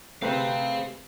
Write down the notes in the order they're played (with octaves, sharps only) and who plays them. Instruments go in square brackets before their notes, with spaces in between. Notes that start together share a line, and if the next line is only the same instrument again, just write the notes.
[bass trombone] C3 [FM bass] A3 [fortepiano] C4 B4 [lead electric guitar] G#4 F5